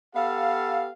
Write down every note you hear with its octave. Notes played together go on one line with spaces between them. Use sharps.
B3 G4 A4 F5